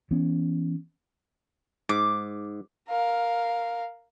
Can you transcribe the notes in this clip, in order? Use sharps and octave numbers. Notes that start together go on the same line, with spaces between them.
E3 B3 C#4
G#2 D6
A#4 F5